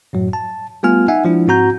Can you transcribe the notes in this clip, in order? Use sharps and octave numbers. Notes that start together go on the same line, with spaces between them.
F#2 A2 F#3
A5
G3 A3 B3 F4 G#5 F6
D#4 E5 F#5 G#5
F3 G#3 D4 E4
G#2 C4 F#4 A#5 G6